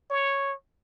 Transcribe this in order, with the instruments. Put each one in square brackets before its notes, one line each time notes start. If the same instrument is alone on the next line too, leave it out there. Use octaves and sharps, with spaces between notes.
[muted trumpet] C#5